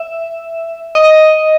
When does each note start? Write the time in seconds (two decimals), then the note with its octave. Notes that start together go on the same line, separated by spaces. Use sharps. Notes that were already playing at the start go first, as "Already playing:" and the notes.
Already playing: E5
0.95 D#5